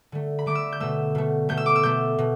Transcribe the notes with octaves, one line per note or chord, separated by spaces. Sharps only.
D3 A3
B5
D3 A3 D6
E6
G6
B2 A3 E6
B2 A3
B2 A3 G6
E6
D6
E6
B2 A3 G6
B2